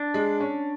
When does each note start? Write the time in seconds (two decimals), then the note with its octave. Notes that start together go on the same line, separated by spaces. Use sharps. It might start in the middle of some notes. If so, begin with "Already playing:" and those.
Already playing: D4
0.14 G#3
0.40 C#4